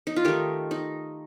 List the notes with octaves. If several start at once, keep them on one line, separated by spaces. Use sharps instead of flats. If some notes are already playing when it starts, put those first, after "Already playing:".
D#4
F4
D#3 A3 D#4 G4
D#4